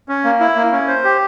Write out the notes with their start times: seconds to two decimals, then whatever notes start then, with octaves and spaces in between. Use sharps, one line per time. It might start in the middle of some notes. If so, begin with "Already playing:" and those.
0.09 C#4
0.24 A#3
0.40 E4
0.56 A#3
0.72 C#4
0.88 C5
1.04 G4